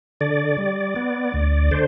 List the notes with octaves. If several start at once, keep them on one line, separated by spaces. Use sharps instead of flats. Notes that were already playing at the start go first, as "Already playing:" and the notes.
D3 D5
G3
B3
D2
D3 C5